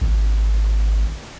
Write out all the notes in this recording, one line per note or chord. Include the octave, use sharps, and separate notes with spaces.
G#1